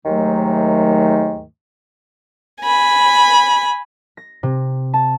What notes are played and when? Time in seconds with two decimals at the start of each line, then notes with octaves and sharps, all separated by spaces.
0.05 D#2 G#2 D#3 F#3 A3
2.62 G#5 B5
4.17 A#6
4.43 C3
4.94 A5